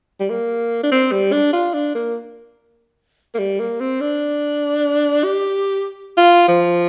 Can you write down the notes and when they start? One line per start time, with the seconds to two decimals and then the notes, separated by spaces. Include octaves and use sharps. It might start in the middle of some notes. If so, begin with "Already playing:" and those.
0.20 G3
0.30 A#3
0.83 D4
0.92 C4
1.12 G3
1.33 D4
1.53 F4
1.74 D4
1.95 A#3
3.35 A#3
3.39 G3
3.60 A#3
3.80 C4
4.01 D4
5.24 G4
6.17 F4
6.48 F3